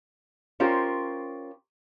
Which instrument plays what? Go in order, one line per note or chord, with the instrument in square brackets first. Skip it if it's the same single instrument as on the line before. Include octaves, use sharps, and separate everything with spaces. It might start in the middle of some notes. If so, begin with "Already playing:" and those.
[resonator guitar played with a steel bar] C#4 F4 G4 A#4 C5